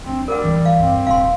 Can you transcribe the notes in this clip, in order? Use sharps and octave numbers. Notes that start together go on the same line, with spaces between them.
D2 C4 D4
G3 A#4 F#5
E3
F5
G2 C4
D#1 F5 C6